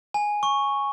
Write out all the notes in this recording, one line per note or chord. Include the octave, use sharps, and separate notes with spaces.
G#5
C#6